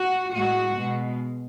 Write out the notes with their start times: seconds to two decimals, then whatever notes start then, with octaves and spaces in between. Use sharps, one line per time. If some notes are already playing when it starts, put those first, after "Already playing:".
Already playing: F#4
0.32 A2 G#3 F#4
0.76 B2 G#3